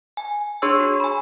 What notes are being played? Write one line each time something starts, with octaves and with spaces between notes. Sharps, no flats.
G#5
D4 G#4 C#5 C6 C#6 E6
F#4
G#5 B5